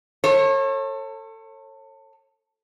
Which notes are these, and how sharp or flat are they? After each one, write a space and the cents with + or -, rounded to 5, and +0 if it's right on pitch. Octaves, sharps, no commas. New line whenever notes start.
A4 +25 C#5 -35